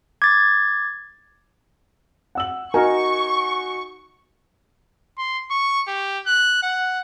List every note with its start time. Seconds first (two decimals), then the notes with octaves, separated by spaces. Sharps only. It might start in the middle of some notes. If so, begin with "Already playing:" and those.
0.22 D6 G#6 A6
2.35 F#5 E6 F#7
2.74 D#4 F#4 A#4 G#5 C#6
5.18 C6
5.51 C#6
5.88 G4
6.27 F#6
6.63 F#5